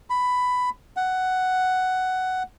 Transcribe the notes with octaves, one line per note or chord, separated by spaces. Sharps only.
B5
F#5